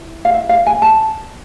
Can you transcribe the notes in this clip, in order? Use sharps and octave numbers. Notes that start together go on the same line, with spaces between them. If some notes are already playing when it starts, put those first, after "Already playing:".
Already playing: E4
F5
E5
F5
G#5
A5